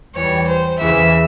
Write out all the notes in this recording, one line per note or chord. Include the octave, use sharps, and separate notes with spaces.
E2 E3 G3 C#5
C5
E2 C#3 E3 E5